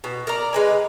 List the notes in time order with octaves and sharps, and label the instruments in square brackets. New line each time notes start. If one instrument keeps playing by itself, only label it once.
[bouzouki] B2
A#4 D5 A#5
G#3 B4 G#5